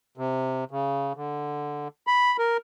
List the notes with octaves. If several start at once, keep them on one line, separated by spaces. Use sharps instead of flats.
C3
C#3
D3
B5
A#4